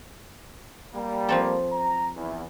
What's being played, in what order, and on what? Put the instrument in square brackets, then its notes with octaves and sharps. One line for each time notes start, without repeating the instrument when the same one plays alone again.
[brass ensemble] G3 A#3
[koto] F3 C4 A4
[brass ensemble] A#5
E2